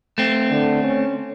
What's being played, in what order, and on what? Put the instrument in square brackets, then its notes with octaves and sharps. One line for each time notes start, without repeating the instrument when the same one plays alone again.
[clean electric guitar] A3 C4
[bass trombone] D3
C#4